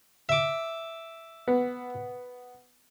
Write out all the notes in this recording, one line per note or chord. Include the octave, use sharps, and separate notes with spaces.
E5 D6
B3